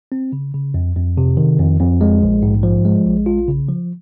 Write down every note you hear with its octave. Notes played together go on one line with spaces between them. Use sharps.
C4
C#3
C#3
F2
F2
C3
D#3
F2
F2
G#3
A#1
G#2
F3
G#3
A#1
F4
C#3
F3